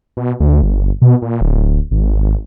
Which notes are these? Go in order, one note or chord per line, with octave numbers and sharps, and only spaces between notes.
B2
D2
G1
B2
A#2
D1
G#1